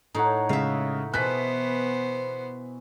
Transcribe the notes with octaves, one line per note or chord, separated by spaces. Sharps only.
A2 D#4 C#5 F#5
C#3 G#3 E5 F5
B2 E3 B3 C5 F#6 B6